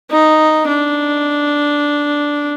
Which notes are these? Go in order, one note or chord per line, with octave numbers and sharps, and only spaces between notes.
D#4
D4